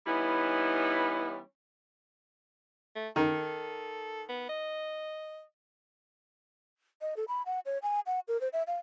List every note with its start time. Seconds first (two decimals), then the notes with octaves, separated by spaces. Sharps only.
0.07 E3 G3 B3 C#4 D#4 E4
2.96 A3
3.16 D#3 A4
4.29 B3
4.49 D#5
7.01 D#5
7.17 A4
7.28 B5
7.46 F#5
7.66 C#5
7.82 G#5
8.06 F#5
8.28 A#4
8.41 C5
8.53 E5
8.67 F5